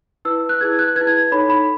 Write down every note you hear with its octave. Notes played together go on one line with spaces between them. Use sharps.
E4 B4 E6
F#6
E4 G#4 B4 G#6
F#6
B4 G#6
E4
G#6
D#4 A4 C#5 B5
B5